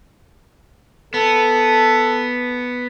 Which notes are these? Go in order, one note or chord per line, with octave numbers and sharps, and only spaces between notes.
B3 A4